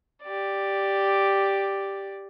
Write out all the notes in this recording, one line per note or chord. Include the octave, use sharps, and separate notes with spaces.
G4 D5